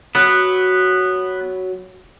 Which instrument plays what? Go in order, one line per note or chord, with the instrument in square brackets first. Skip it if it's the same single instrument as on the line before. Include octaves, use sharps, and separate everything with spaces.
[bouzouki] F#3 [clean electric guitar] B3